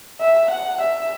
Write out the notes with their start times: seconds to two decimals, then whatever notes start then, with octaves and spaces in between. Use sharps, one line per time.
0.21 E5
0.51 F#5
0.81 E5